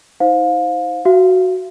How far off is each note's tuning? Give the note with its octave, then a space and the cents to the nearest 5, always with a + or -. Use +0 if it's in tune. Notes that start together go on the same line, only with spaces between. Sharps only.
D#4 +40 C5 +0 F5 +25
F#4 +0 F5 -40